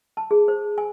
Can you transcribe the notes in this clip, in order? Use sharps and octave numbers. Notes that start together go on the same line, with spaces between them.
A5
G#4
C5
G#5